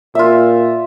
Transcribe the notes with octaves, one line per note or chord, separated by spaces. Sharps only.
A#2 F4 E5